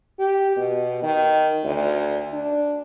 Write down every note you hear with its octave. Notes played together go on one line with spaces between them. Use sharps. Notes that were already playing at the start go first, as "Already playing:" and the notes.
G4
B2
D#3
D2
D4